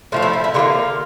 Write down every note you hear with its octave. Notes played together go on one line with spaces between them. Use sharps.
A2 F3 A3 F4
E4
E4
E4
D3 G3 A#3 F4